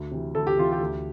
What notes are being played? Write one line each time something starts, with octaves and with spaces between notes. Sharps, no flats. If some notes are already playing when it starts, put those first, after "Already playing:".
Already playing: D2
C3 E3
D2 A4
G4
C3 E3 F4
G4
D2